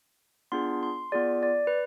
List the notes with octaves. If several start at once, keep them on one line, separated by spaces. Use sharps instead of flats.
B3 D4 F4 G#4 C6
C6
B3 F4 G#4 D5
D5
B4